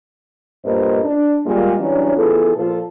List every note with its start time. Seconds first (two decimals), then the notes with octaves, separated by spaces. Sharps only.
0.64 G2 A#2 A#3 A#4 C5 D#5
1.05 D4
1.46 A#2 G3 G#3
1.79 E3 F#3 G3 C#4 D4
2.16 E3 B3 F4 G#4 A4
2.56 A#2 F3 F4 A4